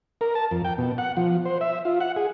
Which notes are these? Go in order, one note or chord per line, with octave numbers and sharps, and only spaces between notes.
A#4
A5
F2
G5
B2
F#5
F3
C5
E5
F4
F#5
G#4